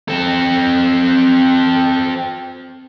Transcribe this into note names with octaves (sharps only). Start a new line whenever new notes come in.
C4 A4